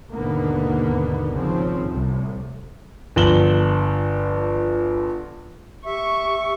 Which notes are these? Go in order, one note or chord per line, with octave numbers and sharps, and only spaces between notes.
D#2 G#2 B2 D3 A#3 B3
G#1 C#3 F3 C4
C2 A2
G1 F3 E7 F#7 G7
G4 E5 C#6